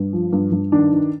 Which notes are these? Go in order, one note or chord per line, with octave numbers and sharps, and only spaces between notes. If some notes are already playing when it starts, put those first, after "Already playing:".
Already playing: G2
F3
G2
G2
D#3 D4
D#3